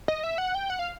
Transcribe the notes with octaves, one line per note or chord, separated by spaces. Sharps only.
D#5
E5
F#5
G5
F#5
F5